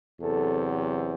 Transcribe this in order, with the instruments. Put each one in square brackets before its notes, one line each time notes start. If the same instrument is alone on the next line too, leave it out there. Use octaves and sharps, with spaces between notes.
[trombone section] E2 C3 F#3 C4 A4